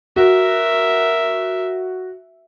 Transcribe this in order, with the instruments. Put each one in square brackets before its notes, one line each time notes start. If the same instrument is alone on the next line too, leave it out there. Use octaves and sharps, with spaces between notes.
[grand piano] F#4 [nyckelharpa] A#4 E5